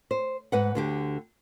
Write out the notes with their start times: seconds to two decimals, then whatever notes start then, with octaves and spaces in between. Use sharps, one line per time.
0.11 C5
0.52 G#2 B4 F#5
0.75 D2 D3 G4